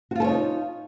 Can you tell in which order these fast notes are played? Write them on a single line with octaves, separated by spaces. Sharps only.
F#4 F4 A4 C#5 D#4